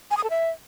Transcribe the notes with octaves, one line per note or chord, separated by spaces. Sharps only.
G#5
D#6
A4
E5